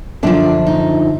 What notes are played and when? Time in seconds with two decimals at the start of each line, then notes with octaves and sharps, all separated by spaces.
0.23 F#2 D3 F3 D4
0.67 D#4